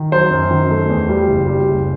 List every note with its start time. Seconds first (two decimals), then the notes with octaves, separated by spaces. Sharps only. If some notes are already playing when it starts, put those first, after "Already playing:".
Already playing: D#3
0.12 F#3 C5
0.31 F#2
0.51 D#3
0.70 A3
0.89 E2
1.09 G3
1.27 F#1
1.47 G3
1.67 F#1